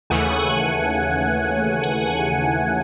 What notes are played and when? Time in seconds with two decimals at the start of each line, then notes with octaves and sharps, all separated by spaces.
0.10 D#2 C#3 E3 A3 F#5 G#5
1.83 F#5 G#5